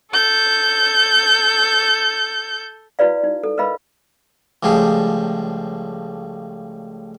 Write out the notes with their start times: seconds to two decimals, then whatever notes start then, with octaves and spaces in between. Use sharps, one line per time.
0.12 A4 G6
2.99 E4 F#4 B4 D5 F5
3.24 D#4
3.44 A4
3.58 A#4 B4 D#5 F5 B5
4.63 C#2 A2 F3 G3 G#4